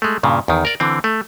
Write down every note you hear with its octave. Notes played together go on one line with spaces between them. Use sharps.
G#3 A3
G2 A#2 C#3
E2 D#3
A#4 D5
D3 E3 C4
A3